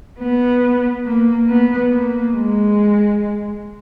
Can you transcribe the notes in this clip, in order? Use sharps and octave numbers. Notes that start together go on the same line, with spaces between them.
B3
A#3
B3
A#3
G#3